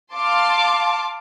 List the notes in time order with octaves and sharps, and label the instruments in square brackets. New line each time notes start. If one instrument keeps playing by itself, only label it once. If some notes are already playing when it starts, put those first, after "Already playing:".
[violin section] F5 A5 C6 D6